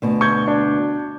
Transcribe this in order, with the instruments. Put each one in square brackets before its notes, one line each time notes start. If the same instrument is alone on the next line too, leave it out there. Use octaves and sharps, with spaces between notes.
[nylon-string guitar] D2 B2
[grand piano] C#6 G6 G#6
D4